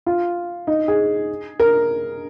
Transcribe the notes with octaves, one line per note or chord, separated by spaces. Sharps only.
F4
D#4
G#4
A#4